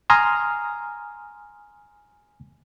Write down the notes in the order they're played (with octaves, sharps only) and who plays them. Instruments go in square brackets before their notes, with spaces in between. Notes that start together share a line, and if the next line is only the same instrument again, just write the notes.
[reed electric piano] G#5 A#5 C6 D#6 F6